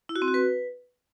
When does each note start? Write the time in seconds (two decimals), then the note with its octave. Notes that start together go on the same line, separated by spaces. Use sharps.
0.09 E4
0.16 F#4
0.22 C4
0.28 F#4
0.34 B4